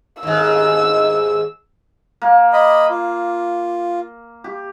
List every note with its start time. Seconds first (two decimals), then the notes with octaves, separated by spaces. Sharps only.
0.23 D#2 G#2 E6
2.22 A#3
2.53 D#5 B5
2.90 F4
4.44 G4